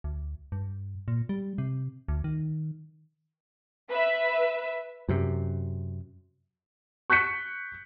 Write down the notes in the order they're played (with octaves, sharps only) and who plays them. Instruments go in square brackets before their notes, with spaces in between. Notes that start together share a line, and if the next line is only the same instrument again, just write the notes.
[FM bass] D2
G2
A#2
G3
C3
D2
D#3
[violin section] B4 E5
[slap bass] F#2 C3
[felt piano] C#6 F#6 G6 B6 C#7